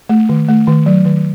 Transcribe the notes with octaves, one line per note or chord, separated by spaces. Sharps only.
A3
D#3
A3
D#3
F#3
D#3